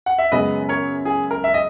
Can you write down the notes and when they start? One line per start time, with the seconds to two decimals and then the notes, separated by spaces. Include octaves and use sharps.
0.06 F#5
0.18 E5
0.32 F#2 C#3 G#3 B3 B4 D#5
0.69 A#4 C#5
1.05 G#4
1.31 A#4
1.44 E5
1.54 D#5